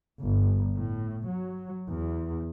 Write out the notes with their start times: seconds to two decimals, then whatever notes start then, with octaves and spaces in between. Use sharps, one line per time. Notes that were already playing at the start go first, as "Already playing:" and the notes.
0.23 G1
0.75 A2
1.27 F#3
1.88 E2